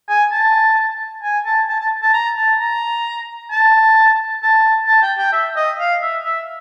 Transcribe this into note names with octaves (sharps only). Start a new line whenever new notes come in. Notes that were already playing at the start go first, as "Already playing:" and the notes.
G#5
A5
G#5
A5
A5
A5
A5
A#5
A5
A#5
A5
A5
A5
G5
G5
E5
D#5
F5
E5
E5